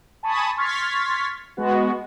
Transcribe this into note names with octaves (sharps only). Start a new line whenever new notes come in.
G#5 A5 B5 C#6 D#6
C6 C#6 F6 G#6 A6 B6
G#3 B3 F#4